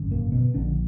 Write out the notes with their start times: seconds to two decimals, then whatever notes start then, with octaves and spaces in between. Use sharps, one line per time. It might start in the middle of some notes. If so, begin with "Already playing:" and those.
Already playing: G#1 F#2 D3
0.11 A#2 A#3
0.32 B2 B3
0.54 A#1 A#2 D3 D4